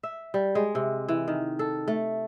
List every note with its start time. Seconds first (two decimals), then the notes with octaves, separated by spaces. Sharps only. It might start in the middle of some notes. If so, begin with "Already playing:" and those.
0.03 E5
0.34 G3
0.55 G#3
0.75 C3
1.09 E3
1.28 D#3
1.59 A4
1.88 A3